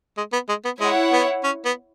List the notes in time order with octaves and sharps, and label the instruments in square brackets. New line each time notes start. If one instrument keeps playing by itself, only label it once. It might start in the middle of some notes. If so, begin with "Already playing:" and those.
[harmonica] G#3
B3
G#3
B3
[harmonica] G#3 [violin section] E4 C#5 F#5
[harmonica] B3
C#4
B3